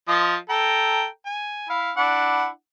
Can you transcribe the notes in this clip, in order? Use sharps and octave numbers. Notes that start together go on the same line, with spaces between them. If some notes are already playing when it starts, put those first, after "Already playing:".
F3 F4 D#5
A4 G5 A#5
G#5
E4 F5
D4 E4 F#5